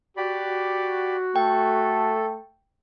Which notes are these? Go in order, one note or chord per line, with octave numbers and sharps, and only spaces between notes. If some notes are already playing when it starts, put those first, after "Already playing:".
F#4 G4 D5 B5
A3 A4 G5